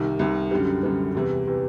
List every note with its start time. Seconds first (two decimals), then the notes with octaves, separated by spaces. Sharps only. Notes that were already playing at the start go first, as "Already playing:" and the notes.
Already playing: C2 C3 D#3
0.19 C2 C3 D#3
0.51 F#2 D3 G3
0.83 F#2 D3 G3
1.15 E2 C3 E3
1.47 C3 E3